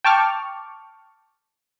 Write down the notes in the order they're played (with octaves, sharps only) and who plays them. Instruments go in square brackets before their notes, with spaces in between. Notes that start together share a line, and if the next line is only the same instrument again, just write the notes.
[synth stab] G5 A5 C#6 D6 F6